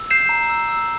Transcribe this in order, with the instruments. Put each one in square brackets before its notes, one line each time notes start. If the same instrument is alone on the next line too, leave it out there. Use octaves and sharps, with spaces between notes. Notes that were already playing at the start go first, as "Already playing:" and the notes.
Already playing: [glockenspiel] E6
G6 C7 E7
A#5
E6
E6